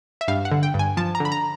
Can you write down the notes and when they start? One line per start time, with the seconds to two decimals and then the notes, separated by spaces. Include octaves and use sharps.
0.21 E5
0.28 G2 F5
0.45 F#5
0.52 D3
0.63 G5
0.74 G2
0.79 G#5
0.97 F3 A5
1.15 A#5
1.20 D3
1.25 B5
1.32 A#5